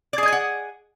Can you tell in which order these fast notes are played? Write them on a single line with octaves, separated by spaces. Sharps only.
D5 G#4 D#5 G#5 F#5